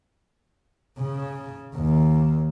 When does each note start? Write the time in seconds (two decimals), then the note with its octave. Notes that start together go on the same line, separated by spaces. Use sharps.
0.99 C#3
1.75 D#2